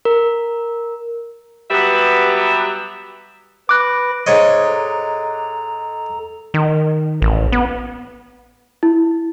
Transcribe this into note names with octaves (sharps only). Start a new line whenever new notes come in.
A#4
F#3 G3 B3 G4 B4 E5
B4 B5 D6 F#6 A#6
G#2 C5 C#5 D#5
A4 A#5
D#3
A1
B3
E4